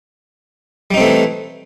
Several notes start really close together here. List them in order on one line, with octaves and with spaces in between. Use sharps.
G3 D#4 C4 A3 E3